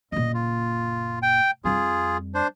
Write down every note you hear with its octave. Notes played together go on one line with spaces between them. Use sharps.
F#1 A#2 D#5
F4
G5
F2 G3 F4 G#4
D4 C5